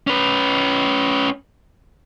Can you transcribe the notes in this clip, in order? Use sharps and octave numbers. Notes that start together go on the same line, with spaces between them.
C#4 B4